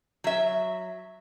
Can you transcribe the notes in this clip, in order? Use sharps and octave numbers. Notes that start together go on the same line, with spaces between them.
F#3 E5